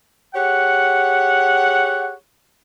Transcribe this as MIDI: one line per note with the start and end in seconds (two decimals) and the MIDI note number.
0.35 2.13 67
0.35 2.13 68
0.35 2.13 73
0.35 2.13 78